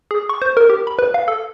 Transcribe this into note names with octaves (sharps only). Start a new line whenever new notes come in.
G#4
C#6
C5
A#4
G4
B5
B4
F5
A4